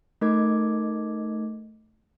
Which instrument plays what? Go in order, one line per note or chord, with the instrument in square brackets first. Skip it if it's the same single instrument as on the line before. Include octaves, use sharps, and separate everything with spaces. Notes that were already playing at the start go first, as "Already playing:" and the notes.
[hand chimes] A3 D#4 A#4 D#5 D6 G#6